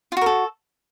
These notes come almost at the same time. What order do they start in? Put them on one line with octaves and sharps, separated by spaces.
F4 F#4 A#4 A4